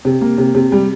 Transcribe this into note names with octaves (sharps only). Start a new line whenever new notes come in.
C3
A#3
C3
C3
G3